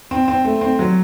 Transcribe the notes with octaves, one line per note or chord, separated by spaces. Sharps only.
C4
C4
A3
C4
F#3